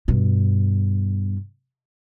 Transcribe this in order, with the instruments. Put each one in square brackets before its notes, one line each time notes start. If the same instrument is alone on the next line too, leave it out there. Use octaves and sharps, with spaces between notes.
[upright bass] G2 B2